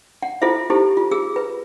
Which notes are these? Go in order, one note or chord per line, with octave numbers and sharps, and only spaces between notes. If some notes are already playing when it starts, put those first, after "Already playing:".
F#5
E4 F4 A4 C5 E5
D#4 E4 G4 A4 C5
F4
G#4 E6
B4